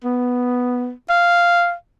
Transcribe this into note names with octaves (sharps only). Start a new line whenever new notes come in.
B3
F5